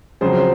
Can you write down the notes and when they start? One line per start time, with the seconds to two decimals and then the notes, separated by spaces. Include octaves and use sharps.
0.21 F2 C#3 F#3 G#4 C5
0.37 C5